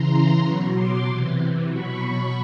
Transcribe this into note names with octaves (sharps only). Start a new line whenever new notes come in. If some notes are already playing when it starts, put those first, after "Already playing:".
Already playing: C#3 E3 A#5 C6
B2 F#3 B5 C#6
C6 D6
C3 E3
B2 F#3 B5 C#6